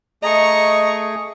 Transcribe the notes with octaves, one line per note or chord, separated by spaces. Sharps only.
A3 G#4 D#5 A#5 C#6